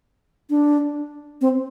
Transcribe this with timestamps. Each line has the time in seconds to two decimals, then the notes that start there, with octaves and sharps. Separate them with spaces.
0.50 D4
1.41 C4